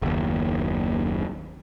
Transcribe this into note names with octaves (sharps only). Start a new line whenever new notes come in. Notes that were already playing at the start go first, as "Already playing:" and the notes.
F#1 D#2